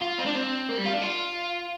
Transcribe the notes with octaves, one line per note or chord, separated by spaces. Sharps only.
F4
C4
D4
C4
A#3
G3
F4
D4
F4